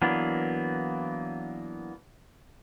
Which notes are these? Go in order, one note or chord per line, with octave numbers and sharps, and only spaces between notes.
E3 F#3 A#3 B3 D4